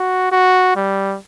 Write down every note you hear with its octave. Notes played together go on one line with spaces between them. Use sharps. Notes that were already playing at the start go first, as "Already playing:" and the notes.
Already playing: F#4
F#4
G3